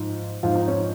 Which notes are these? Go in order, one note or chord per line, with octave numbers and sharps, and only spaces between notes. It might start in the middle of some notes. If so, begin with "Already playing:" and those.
Already playing: G#2 F3
G#2 F3 F4
D#4
C#4